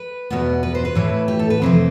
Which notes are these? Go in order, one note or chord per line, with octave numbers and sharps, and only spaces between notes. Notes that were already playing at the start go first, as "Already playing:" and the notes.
Already playing: B4
E2 B2 B3
B4
C5
B4
A2 E3 A3
G4
A4
B4
F2 C3 E3 A3 C5